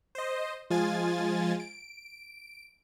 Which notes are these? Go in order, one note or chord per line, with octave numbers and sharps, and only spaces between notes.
C5 D#5
F3 G#3 F4 G#5 A6
D7